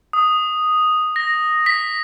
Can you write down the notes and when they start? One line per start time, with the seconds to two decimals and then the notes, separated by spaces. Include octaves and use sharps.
0.13 D#6
1.16 A#6
1.66 B6